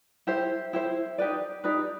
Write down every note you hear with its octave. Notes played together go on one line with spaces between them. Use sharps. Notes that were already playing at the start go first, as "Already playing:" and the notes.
E4 G4 C5
E4 G4 C5
D#4 G4 B4 D5
D#4 G4 B4 D5